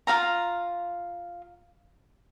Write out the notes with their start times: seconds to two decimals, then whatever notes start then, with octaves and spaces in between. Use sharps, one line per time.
0.07 F4 F#4 F5 A#5